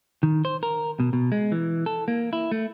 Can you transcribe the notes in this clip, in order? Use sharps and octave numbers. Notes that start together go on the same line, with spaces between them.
D#3
C5
A#4
B2
B2
G#3
E3
A4
A#3
E4
A3